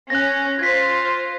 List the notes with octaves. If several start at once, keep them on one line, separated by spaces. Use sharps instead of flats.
C#4 F#6 A#6
F4 C5 G#6 B6